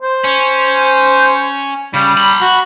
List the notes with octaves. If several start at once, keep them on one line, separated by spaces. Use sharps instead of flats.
C5
C#4
C#3 G3
B5 C6
F#4